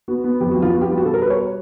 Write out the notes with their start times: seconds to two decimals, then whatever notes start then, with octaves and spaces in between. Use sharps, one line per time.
0.08 B3 F#4
0.24 B3
0.40 F2 G4
0.51 F#4
0.57 F2
0.62 F4
0.73 B3 F#4
0.81 G4
0.89 G3 F4
0.98 F#4
1.05 B2 A4
1.14 A#4
1.22 G3 B4
1.30 C#5